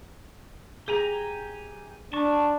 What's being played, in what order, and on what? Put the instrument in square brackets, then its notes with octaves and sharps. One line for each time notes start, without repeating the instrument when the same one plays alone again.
[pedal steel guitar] G4 G#5 A#5 [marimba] G#4
[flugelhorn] D4 [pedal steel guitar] A5 C#6